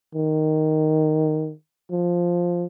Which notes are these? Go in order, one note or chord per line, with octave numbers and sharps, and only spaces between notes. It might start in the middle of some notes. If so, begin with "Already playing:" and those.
D#3
F3